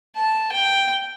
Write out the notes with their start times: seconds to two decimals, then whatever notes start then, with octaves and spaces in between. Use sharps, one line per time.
0.16 A5
0.52 G5